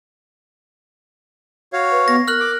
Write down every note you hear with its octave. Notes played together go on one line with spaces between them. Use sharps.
F#4 C#5 F5
B4
B3 A#6
A#4 F6 F#6 F#7
D6